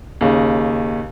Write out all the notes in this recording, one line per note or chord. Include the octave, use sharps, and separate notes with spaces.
D#2 C#3